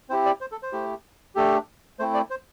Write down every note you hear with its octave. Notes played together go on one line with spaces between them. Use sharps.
C4 E4 G4 C5
D5
C5
A4
C5
A3 E4 G4
A3 D4 G4 A4
A3 C4 E4 C5
D5
C5